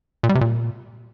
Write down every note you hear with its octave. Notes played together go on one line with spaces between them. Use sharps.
A#2
G3
C3
A#2